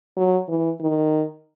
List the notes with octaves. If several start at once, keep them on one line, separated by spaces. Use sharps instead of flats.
F#3
E3
D#3